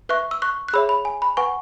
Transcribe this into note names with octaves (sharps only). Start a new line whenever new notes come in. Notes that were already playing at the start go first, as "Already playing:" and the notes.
B4 E5 C#6 F#6
E6
C#6 F#6
F#6
G#4 C#5 E5 B5 E6
B5
G#5
B5
B4 F#5 G#5 C#6